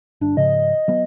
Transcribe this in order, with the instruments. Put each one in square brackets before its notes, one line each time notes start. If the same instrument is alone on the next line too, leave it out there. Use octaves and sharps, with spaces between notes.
[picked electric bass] G1 [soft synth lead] D4
[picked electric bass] G#2 C#3 F3 [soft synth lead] D#5
[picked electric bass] F#3 B3